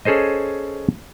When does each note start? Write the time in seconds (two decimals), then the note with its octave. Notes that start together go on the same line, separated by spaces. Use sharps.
0.05 C#4 G#4 A4 C5 D#5